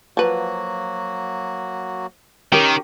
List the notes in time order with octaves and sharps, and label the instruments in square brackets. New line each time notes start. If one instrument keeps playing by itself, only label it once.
[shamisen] F3 B4 [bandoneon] F#3 A#3 F#4
[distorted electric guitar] D#3 [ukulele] C#4 G4 A#4